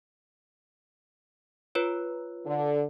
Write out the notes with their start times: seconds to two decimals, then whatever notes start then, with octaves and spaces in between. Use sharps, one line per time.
1.75 F4 B4 C#5
2.46 D3